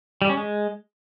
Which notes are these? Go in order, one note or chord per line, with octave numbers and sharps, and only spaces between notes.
G3
C#4
G#3